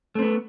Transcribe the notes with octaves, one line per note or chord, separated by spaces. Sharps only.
A3 B3 C4